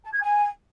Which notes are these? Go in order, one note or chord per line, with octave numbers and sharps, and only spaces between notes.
A5
G#6
G#5